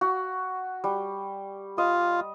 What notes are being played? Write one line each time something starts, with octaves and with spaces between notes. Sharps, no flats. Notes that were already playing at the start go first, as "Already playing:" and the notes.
F#4
G3
F4 D#5